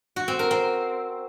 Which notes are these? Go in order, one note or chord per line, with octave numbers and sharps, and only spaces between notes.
F#4
C4
A#4
C4